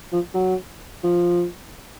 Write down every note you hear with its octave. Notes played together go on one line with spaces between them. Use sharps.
F3
F#3
F3